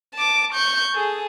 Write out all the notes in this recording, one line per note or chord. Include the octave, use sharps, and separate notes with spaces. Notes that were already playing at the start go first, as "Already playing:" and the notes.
A5 D6
C#6 G6
G#4 A4